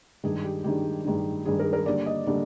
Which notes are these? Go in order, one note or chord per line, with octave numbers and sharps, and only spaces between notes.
G2 D#3 G#3 D4 G#4
G4
G2 D#3 G#3 D4 G4
G2 D#3 G#3 D4
G2 D#3 G#3 D4 G#4
A#4
A#4
D3 G3 A#3 D4 D5
D#5
D3 G3 A#3 D4 D5